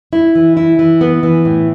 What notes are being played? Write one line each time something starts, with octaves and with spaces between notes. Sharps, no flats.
E4
E3
E4
E3
B3
E3
A2